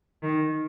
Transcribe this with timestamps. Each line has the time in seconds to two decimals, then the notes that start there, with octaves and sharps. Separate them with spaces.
0.23 D#3